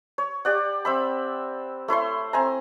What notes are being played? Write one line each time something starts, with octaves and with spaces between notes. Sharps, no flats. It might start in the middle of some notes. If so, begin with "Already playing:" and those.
C#5
G4 D5 F#5
C4 E5 B5
A3 E4 C#5 C6
C4 G#5 A#5